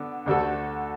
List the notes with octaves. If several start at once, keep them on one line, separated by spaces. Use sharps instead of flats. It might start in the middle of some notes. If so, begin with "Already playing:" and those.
Already playing: D3 B3 D4
D2 D3 A3 F#4 A4